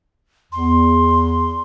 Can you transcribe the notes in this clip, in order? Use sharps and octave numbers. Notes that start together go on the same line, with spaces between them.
E2 C6